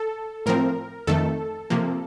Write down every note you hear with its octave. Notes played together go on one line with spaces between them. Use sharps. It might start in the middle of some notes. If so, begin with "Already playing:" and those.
Already playing: A4
A2 F3 C4 A#4
F2 D#3 A3 A4
C3 F3 A#3